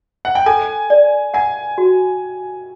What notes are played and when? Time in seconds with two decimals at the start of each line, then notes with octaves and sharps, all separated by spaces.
0.25 F#5
0.35 G5
0.46 A4 G#5
0.90 D5
1.34 F#5 G#5
1.78 F#4